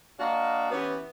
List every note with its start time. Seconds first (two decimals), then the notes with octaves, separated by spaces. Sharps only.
0.20 A#3 D4 F#4 D#5 F5
0.71 E3 B3 C#4 E4 G4